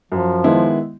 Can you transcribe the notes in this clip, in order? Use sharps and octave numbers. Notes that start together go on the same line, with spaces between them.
F#2 F3
D#3 G#3 B3 E4